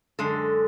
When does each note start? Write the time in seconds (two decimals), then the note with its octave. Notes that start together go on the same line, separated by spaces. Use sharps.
0.19 F#2 D3 G#3 A4